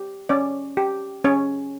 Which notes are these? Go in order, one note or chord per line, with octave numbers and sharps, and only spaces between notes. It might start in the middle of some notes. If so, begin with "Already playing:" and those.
Already playing: G4
C#4 D5
G4
C#4 C#5